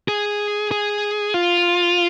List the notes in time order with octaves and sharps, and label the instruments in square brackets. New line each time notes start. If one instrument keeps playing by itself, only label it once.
[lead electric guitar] G#4
G#4
F4